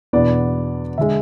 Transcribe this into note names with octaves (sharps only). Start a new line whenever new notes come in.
E2 B2 B3 D4 D5
D3 G#3 E5